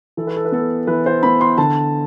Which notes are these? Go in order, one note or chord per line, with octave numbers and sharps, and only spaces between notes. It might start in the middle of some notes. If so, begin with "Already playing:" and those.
E3 A4
B4
A4
B4
B3 A4
E3 B4
C5
B3 B5
C6
D3 A5